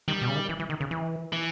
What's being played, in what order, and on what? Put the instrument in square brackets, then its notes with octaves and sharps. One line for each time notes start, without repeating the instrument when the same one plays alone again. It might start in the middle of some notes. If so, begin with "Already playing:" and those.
[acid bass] D#3 [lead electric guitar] G3
[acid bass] B2
C#3
D#3
E3
E3
D#3
C#3
E3
[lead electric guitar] E3